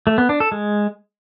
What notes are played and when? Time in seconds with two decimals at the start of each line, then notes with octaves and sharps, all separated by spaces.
0.07 A3
0.18 B3
0.29 D4
0.40 A4
0.52 G#3